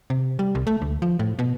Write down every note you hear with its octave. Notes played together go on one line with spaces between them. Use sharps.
C3
G3
C2
A3
D2
F3
A2
B2